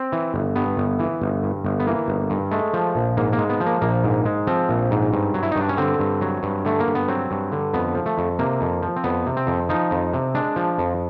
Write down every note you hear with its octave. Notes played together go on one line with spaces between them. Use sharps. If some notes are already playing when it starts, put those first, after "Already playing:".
Already playing: C4
E3
G1
G2 B3
G1
E3
G1
G2
G1
B3
E3 A#3
G1
G2
G#3 A3
F3
A#1
G#2 A#3
A#3
G#3
B3
F3
A#3
A#1 A#3
G#2
G#3
F3 C4
A#1
G#2
G2
F#3
E4
D#4
G2 D4
C#4
D3 C4
G2
F#3
G2
D3 A3
A#3
G2
B3
F#3 C4
G2
D3
F2 B3
F3
A3
F2
C3 A#3
F2
F3
C4
F2 B3
C3
C4
F2
F3 D#4
F2
C3
G#3 D4
F3
F2